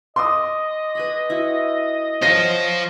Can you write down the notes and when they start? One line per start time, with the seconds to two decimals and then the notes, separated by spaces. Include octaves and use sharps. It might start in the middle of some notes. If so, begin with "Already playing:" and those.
0.16 D#5 C6 D6 D#6
0.95 B4 G#5 B5
1.30 E4 F#4
2.22 F4 C5 C#5 F5 F#5 A#6 D#7